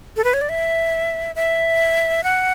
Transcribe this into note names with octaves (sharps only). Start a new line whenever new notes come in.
A4
B4
C#5
D5
E5
E5
F#5